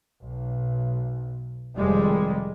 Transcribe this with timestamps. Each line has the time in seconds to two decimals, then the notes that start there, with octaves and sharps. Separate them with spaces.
0.21 B1
1.77 F1 F2 D#3 G3 G#3